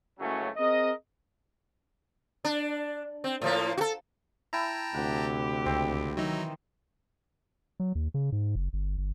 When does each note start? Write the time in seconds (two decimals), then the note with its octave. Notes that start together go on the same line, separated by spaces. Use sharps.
0.19 F#1 C#2 C#3 F#3 A3 C#4
0.57 C4 G#4 A#4 D#5
2.45 D4
3.24 C4
3.42 A2 F3 A#3
3.77 F#4 A4
4.53 E4 G5 A5 A#5
4.94 D2 C3 G4 F#5
5.66 C#2 C4
6.17 D#3 E3 F#3 D#4 E5
7.80 F#3
7.95 D#2
8.14 C#3
8.32 G#2
8.56 F#1
8.73 G1
8.98 G1